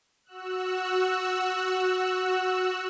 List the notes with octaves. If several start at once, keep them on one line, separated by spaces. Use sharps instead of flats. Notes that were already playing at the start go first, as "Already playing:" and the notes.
F#4 E6 F#6